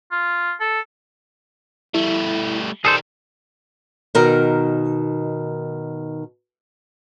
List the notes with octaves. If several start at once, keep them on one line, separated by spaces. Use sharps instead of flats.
F4
A4
G3 A3 E4
D#3 G3 G#4 A4 C5
B2 D#3 D#4 A#4